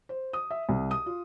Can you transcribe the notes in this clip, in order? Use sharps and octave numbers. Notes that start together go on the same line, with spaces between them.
C5
D#6
E5
C2
D#6
F4